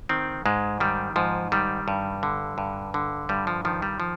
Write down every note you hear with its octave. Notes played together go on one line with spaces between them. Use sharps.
D#3 C4
G#2 G#3
D#3 G3
G#2 F3
D#3 G3
G2
D3
G2
D3
G2 G3
F3
D#3 F3
G3
F3